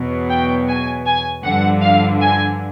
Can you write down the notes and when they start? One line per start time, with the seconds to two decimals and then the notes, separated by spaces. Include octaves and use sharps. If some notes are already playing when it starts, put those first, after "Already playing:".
Already playing: E2 B2 F#3
0.30 G5
0.67 G#5
1.06 G#5
1.45 G2 D3 F3 F#5
1.82 F5
2.21 G#5